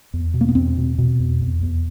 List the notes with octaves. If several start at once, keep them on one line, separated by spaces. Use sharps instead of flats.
E2
B2
A#3
B3
E2 C4
B2
B2
E2
E2
E2